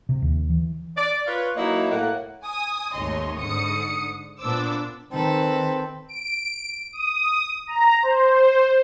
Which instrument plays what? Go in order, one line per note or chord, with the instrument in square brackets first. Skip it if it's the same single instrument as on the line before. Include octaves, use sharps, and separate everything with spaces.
[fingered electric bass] C3
D#2
E3
[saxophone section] D5
F4 B4 C#5
F#3 A#3 D#4 E4 F#4 C#5
A2 A#3 F#5
[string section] G#5 D#6
G#1 D#2 A3 C#5 D#5 C6
G#2 D3 D#6 C#7
A#2 B3 D4 C5 D6 E6
[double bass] D#3 [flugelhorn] C4 [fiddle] A4 B4
[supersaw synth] D7
D#6
A#5
C5